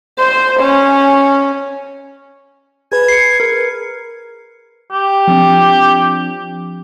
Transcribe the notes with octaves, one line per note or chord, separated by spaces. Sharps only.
C5
C#4
G#4 B4 G#6
C7 C#7
A#4
G4
F3 C4 D4